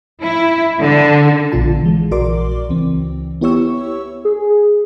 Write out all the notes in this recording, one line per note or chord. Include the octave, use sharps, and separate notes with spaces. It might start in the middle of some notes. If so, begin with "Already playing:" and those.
E4
D3
A#1 B2 D3 F4 A5
E3 G#3
A#1 F#4 A#4 D5 C6 D6
C#2 E3 C4
B3 E4 G4 C#5 C#6 E6
G#4